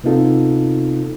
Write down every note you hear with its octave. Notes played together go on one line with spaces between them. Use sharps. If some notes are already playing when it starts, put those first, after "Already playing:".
C3 B3 C4 D#4 F4 A4